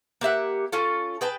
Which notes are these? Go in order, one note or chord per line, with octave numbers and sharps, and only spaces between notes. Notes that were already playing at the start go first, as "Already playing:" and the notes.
A#3 G4 E5 F#5
C#4 F4 A4
G#4 B4 G5 A5